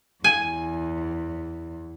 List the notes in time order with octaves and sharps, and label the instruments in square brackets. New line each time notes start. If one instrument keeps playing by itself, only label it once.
[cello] E2 [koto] G#5